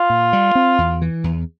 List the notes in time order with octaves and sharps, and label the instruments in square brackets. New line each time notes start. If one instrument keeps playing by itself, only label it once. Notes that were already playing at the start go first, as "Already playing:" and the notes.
Already playing: [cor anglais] F4
[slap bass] A#2
G3
C4
E2
E3
E2